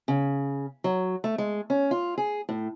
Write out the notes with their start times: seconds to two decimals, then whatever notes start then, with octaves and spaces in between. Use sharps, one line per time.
0.08 C#3
0.84 F#3
1.24 A3
1.38 G#3
1.70 C#4
1.91 F4
2.18 G#4
2.49 A2